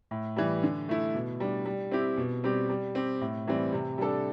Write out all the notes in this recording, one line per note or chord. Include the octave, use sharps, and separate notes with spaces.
A2
E3 G3
D3
A3 E4
B2
G3 D4
G3
C4 E4 G4
B2
G3 C4 G4
G3
C4 G4
A2
E3 G3 C4
C3
G3 D4 A4